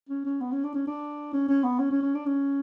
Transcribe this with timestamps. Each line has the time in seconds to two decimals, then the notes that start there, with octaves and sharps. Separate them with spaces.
0.09 C#4
0.25 C#4
0.41 B3
0.52 C#4
0.64 D4
0.74 C#4
0.87 D4
1.33 C#4
1.48 C#4
1.63 B3
1.79 C#4
1.90 C#4
2.02 C#4
2.14 D4
2.26 C#4